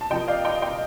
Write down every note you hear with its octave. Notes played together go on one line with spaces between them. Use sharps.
A5
C3 F3 A#3 D#5 G5
D5 F5
D#5 G5
D#5 G5